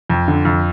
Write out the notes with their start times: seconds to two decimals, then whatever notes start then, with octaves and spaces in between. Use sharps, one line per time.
0.10 F2
0.28 D3
0.45 F2